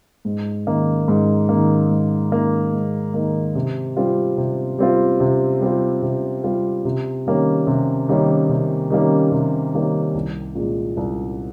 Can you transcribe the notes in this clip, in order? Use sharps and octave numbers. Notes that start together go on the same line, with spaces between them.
G#2
D#3 A#3
G#2
D#3 A#3
G#2
D#3 A#3
G#2
D#3 A#3
C3
G3 C4 F4
C3
G3 C4 F4
C3
G3 C4 F4
C3
G3 C4 F4
C3
D#3 G3 A#3 C#4
C3
D#3 G3 A#3 C#4
C3
D#3 G3 A#3 C#4
C3
D#3 G3 A#3 C#4
C2
A#2 G#3
C2